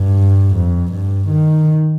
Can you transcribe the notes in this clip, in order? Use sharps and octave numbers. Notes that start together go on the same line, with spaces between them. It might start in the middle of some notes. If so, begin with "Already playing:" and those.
Already playing: G2
F2
G2
D#3